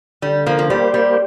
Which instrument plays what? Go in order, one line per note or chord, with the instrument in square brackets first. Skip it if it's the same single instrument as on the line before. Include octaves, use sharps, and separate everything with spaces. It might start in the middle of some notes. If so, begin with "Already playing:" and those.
[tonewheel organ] D3 [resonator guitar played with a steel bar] G3
[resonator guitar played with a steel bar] F3 A#3
F3
[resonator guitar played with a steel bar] G3 [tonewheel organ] A#3 G4 C5
[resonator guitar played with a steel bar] G3